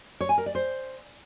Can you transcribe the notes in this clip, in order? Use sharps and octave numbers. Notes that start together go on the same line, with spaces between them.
C#5
G#5
A#4
D5
C5